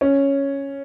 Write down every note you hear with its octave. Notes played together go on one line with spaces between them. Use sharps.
C#4